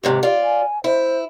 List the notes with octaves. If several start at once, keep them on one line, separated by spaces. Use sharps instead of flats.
D#2 G#2 C3 G4
F4 D5
G#5
E4 C5